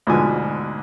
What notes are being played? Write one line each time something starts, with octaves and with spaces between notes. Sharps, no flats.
D2 G#2 B2 D3 F3 G#5